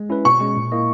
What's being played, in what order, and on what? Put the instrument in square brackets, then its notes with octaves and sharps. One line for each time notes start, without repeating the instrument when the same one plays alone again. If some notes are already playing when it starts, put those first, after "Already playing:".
Already playing: [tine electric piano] G#3
C#4 E4 B4
[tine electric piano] B2 [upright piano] C#6
[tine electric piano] G#3 C#4
A#2
A#3 E4 A#4 D#5